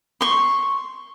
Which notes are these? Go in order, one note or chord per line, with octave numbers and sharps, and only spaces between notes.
C6 C#6